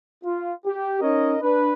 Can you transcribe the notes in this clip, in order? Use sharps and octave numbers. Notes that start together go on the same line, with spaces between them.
F4
G4
C#4 D#4 A#4 C#5 D#5
D4 B4